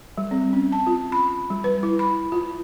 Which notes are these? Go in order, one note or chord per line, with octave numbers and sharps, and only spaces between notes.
G3
C4
C#4
A5
F4
B5
G3
B4
E4
B5
F4